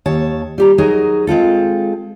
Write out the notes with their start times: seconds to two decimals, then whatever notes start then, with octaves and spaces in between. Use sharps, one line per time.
0.06 D#2 C#5 A5
0.58 G3 G4 A#5
0.78 F#3 D#4 G#4 A#4
1.27 G#3 C4 F4 A4